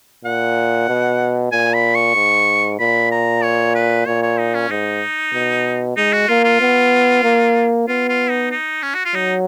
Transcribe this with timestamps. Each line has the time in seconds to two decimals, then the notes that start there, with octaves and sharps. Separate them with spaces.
0.25 A#2 F#5
0.89 B2
1.52 A#2 G#5
1.74 B5
1.95 C#6
2.15 G#2
2.80 A#2 B5
3.11 A#5
3.43 C#5
3.75 B4
4.07 A#2 C#5
4.22 C#5
4.38 D#4
4.54 C#4
4.70 G#2 D#4
5.33 B2
5.97 G#3 D#4
6.13 F#4
6.28 A#3 F4
6.44 F4
6.61 B3
7.24 A#3
7.88 B3 F4
8.09 F4
8.30 D#4
8.51 D#4
8.83 C#4
8.95 F#4
9.05 F4
9.15 F#3 D#4